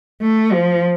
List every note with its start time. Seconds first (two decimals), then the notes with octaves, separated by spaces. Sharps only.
0.21 A3
0.53 F3